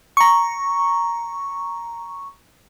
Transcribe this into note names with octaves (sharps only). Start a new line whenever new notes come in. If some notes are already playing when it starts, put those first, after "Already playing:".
A#5 C#6